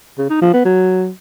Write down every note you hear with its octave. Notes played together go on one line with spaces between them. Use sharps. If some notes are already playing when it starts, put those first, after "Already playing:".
C#3
D#4
F3
B3
F#3